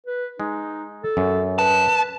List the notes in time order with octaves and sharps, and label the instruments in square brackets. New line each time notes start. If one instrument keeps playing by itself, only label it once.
[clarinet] B4
[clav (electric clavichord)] G#3 [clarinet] D#4
[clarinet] A4
[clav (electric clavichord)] F#2
[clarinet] B4 [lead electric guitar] A5